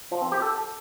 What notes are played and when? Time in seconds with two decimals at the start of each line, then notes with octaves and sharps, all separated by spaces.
0.11 F3
0.22 C4
0.32 G4
0.42 A4